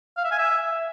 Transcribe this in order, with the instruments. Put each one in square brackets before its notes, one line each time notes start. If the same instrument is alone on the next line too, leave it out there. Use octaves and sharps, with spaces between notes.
[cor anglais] F5
E5
G#5
E5